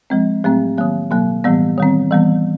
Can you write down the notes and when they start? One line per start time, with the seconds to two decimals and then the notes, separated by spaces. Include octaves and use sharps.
0.10 F3 G#3 C4
0.44 A2 F#3 A3 C4
0.78 D#3 F#3 A#3
1.11 B2 F#3 A#3
1.44 A2 E3 G3 B3
1.78 D#3 G3 C4
2.11 E3 G3 B3